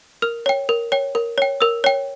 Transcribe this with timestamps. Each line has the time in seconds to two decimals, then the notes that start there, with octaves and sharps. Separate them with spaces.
0.22 A#4 F6
0.46 C#5 G5
0.69 A#4
0.92 C#5 G5
1.15 A#4
1.38 C#5 G5
1.61 A#4 E6
1.84 C#5 G5